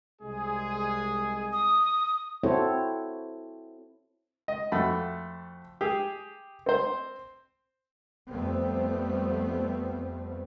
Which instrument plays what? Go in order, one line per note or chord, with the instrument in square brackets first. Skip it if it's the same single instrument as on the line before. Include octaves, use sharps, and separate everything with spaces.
[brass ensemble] C2 G#3 G#4
[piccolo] D#6
[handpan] C4 E4 F#4 A4 C5 C#5
[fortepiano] D#5
F2 A3 F#4 B5
G4 G#4
C4 C5
[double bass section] F2 G3 A3 B3 C4